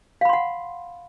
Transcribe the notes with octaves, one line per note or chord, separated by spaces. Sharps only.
F5 F#5 B5 C6